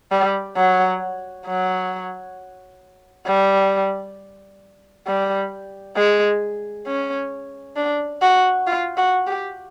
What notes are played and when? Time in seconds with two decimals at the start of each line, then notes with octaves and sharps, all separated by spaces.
0.11 G3
0.57 F#3
1.46 F#3
3.26 G3
5.07 G3
5.96 G#3
6.87 C#4
7.76 D4
8.22 F#4
8.67 F4
8.97 F#4
9.27 G4